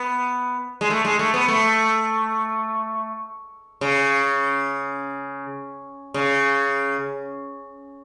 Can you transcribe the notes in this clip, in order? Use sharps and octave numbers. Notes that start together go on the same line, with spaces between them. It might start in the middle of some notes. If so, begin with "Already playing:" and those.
Already playing: B3
G#3
A3
G#3
A3
B3
A3
C#3
C#3